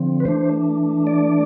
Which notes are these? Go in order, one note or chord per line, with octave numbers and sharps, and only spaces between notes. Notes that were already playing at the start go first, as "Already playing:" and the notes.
Already playing: D3 F3 C4
B4
E3 A3 D4 C5
D5